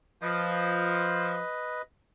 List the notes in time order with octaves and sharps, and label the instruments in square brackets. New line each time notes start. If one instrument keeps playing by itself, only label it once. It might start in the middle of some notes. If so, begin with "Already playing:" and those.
[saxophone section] F3 [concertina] B4 D#5